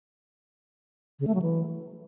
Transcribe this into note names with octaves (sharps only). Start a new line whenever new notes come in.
C#3
A3
F#3
E3